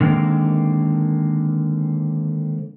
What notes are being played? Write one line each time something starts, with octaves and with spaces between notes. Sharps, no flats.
D3 D#3 G#3 A#3 C4